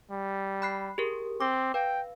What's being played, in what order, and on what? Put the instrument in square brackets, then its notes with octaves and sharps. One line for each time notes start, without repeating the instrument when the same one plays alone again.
[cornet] G3
[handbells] B5 F#6 C7
G4 G#4 A#4
[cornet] C4 [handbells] D6
[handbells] B4 F5 [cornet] G5